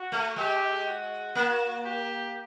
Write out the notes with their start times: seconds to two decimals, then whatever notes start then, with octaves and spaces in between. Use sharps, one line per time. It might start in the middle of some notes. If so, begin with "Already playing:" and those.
Already playing: F#4
0.12 A3
0.36 G#3 G4
0.87 F#4
1.35 A#3
1.85 G4